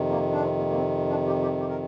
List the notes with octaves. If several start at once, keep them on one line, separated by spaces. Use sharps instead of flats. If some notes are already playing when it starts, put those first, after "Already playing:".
Already playing: F2 C3 D#3
A#3
D4
C4
A#3
A#3
C4
D4
G4
G4
G4
A#4